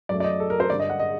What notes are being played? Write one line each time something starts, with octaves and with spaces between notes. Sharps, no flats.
F#2 F#3 A3 D5
D5
D#5
A4
A#4
C5
G2 D3 G3 D5
D#5
F#5
D#5